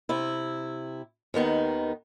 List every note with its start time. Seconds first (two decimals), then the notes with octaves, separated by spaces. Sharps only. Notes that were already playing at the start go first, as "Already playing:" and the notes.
0.09 C3 E4
1.34 D#2 D#3 B3 D#4